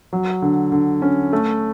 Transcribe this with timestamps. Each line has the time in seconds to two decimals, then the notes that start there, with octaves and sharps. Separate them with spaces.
0.13 F#3
0.42 D3
0.72 D3
1.02 C#4
1.33 A3